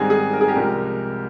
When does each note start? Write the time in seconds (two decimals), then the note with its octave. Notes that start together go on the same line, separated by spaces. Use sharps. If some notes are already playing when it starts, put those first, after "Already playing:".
Already playing: G#2 D#3 G3 C4 G#4
0.10 G#4
0.33 A#4
0.41 G#4
0.48 G4 A#4
0.55 C2 C3 F3 G#3